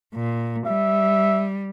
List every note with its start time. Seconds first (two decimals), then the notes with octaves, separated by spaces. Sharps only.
0.15 A#2
0.67 G3 E5